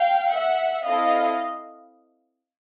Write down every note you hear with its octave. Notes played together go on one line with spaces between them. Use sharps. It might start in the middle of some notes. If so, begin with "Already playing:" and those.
Already playing: F5 G5
E5 F#5
C4 E4 A4 D#5 F5